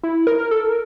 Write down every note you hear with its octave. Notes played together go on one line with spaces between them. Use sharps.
E4
A#4
A4
A#4